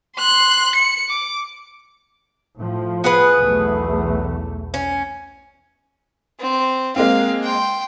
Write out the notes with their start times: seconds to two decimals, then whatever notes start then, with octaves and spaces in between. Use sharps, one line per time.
0.18 C6 F#6
0.76 C#7
1.09 D6
2.59 A2 F3
3.04 B3 G#4 B4
3.38 B1 E2 A3
4.74 C#4
6.40 C4
6.96 G#3 A#3 C4 F5
7.43 G5 C6